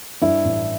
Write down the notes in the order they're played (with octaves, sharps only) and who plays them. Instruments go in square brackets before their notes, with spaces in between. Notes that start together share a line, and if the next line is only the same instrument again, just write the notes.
[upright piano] G2 E4
A1